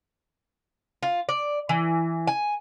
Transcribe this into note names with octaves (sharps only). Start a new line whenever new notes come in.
F4
D5
E3
G#5